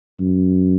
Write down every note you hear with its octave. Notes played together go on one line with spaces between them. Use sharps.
F#2